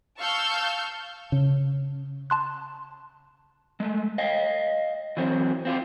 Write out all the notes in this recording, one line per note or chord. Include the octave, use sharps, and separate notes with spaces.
F5 A5 C#6 E6 F6 G6
C#3
A5 C6 F#6
G#3 A3
D#5 F5 G5
E3 F#3 C4
C4 F4 G4